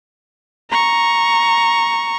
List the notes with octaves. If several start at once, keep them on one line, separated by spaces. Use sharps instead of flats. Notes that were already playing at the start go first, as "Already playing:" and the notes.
A#5 C#6